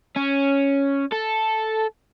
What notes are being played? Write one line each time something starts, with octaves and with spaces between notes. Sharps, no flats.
C#4
A4